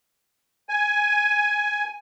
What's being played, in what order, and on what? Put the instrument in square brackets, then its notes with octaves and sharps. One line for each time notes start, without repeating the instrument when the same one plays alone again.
[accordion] G#5